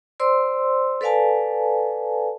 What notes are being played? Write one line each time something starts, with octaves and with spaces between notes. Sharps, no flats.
C5 D5 C6 E6
A4 B4 D5 F5 G#5 A5